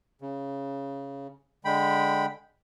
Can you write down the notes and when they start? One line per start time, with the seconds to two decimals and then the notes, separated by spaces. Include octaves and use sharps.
0.22 C#3
1.65 D3 G#3 G5 B5